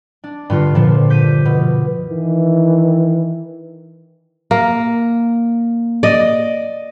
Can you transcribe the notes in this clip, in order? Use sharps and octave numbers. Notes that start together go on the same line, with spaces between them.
D4
G2 D3 F4
G2 A#2 D3 F3
D6 G6 B6 D#7
B2
D#3 E3
A#3
D5 D#5